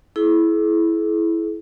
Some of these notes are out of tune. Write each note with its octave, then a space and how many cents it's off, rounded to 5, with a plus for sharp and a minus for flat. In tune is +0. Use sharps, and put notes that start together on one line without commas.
E4 +0 G#4 +40